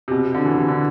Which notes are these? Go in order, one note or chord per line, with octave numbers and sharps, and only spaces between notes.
C3
B2
C3
D3
E3
E3
D3